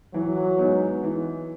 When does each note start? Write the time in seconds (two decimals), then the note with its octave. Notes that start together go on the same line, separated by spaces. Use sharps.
0.13 E3 F#3
0.58 G#3 B3 D#4
1.03 E3